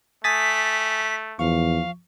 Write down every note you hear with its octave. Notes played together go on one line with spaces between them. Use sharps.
A3 G#5 D#6 A6 B6
E2 F3 F5 C#6